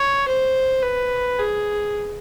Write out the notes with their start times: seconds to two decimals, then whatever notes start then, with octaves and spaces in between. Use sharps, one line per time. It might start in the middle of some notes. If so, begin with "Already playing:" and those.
Already playing: C#5
0.28 C5
0.82 B4
1.39 G#4